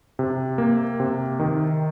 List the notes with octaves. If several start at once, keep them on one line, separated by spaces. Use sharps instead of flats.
C3
A#3
C3
D#3